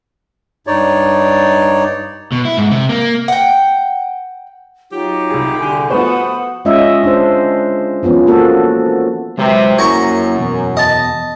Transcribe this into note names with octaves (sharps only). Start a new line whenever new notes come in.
G2 D#4 C#5 D5
B2
E4
G#2
C3
A#3
F#5 G5
F#3 D#4 F4 G4
C2 G#4
D3 F#4 G#5
F3 A3 B3 F#4 C5 F#5 B5 D#6
G#3 C#4 F4 D#5 E5
D4 C5
E3 F3 B3 C#4
A#3 F#4 A4
C3 F#3 G#3 B4
F#2 A#3 E4 C#5 A#5 C#6
E2 B2
D#5 A5